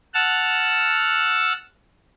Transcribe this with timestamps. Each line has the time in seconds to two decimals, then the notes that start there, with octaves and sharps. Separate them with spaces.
0.14 F#5 A5 E6 F6